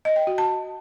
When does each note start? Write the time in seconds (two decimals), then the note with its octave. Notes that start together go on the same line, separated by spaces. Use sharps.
0.05 D#5
0.16 G5
0.27 F#4
0.38 A5